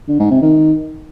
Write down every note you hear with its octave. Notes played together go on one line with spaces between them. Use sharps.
D3
G#2
C3
D#3